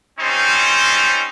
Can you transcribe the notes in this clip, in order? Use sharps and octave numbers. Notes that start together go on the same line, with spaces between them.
G3 C4 C#4 D#4 C5